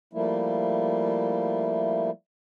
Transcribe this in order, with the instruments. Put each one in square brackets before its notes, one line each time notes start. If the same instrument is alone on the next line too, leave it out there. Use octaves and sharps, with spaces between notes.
[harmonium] F3 G3 A3 A#3 E4